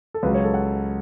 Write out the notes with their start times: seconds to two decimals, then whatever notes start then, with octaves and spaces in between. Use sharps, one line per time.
0.14 A4
0.23 C#2 C#3 F#3 B4
0.34 C#5
0.44 A4
0.54 F#5